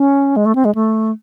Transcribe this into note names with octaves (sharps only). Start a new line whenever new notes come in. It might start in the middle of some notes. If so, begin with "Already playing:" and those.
Already playing: C#4
G#3
A3
C4
G#3
A3